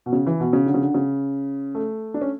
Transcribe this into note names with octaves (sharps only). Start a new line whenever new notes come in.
B2
C#3
E3
B2
C#3
D3
C#3
D3
C#3
A3
D4
C#4